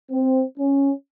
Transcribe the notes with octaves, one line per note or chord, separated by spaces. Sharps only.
C4
C#4